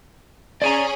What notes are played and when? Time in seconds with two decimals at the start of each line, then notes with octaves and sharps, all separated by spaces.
0.62 C#4 G#4 D5 G#5 A#5